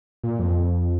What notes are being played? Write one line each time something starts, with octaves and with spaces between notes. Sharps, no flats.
A#2
F2